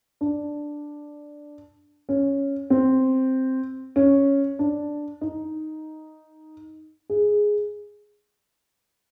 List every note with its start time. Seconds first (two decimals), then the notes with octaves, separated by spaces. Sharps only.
0.21 D4
2.09 C#4
2.70 C4
3.96 C#4
4.59 D4
5.21 D#4
7.10 G#4